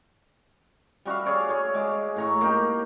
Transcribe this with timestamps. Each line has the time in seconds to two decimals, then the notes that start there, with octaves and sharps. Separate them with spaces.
1.05 G3 F#4 E5 F5
1.26 G#4 C#5 D5
1.49 G#4 C#5
1.74 G#3 D6
2.16 A2 A#5 C#6
2.41 A#3 D#4 G4